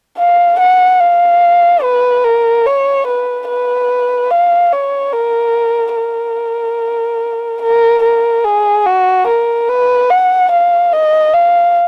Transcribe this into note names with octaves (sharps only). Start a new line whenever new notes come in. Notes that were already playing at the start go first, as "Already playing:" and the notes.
F5
F#5
F5
B4
A#4
C#5
B4
B4
F5
C#5
A#4
A#4
A#4
A#4
G#4
F#4
A#4
B4
F#5
F5
D#5
F5